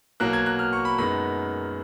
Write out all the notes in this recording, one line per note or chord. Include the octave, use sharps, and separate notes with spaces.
B2 F#3 A#3 F#6
G#6
F#6
F6
C#6
B5
F#2 D#3 G#3 B3 B5